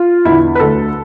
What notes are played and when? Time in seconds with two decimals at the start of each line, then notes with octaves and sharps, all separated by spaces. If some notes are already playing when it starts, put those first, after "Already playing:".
Already playing: F4
0.25 E2 D3 E4
0.55 B4
0.59 D2 D3 A4